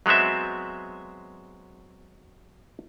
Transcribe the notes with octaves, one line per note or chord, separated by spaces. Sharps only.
F#3 G#3 B3 C4 E5